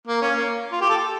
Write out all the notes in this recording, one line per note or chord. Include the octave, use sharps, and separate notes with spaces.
A#3
C#4
A#3
F4
G4
A4